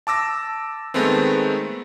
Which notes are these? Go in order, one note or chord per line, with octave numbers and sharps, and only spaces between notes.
A5 D6 E6 A#6
D#3 G#3 A3 B3 C4